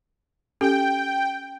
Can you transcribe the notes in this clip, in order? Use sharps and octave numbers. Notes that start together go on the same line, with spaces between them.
C#4 G4 A4 G5